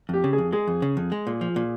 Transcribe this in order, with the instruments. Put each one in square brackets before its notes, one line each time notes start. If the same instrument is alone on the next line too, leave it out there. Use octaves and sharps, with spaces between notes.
[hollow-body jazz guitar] F2 [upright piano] G4
[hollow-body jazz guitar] C#3
[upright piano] G#4
[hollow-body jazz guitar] F2
[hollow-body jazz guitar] G#3 [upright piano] G#4
[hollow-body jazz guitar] F2
C#3
F2
G#3
A#2
F3
A#2